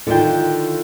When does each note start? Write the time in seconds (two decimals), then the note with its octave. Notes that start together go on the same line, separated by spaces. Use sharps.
0.07 D3 D#3 E4 F4 G5